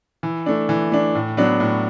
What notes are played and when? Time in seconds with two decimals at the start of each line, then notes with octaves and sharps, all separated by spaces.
0.23 E3
0.46 A3 D4
0.69 E3
0.92 A3 D4
1.15 A2
1.37 F#3 B3 D4
1.60 A2